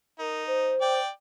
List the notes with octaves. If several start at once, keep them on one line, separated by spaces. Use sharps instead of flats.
D#4 A#4
C5
D5 G5